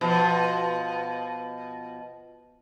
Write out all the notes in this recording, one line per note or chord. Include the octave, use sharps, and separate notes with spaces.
B2 F3